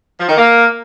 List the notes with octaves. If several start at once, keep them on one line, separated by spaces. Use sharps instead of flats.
F3
D#3
A#3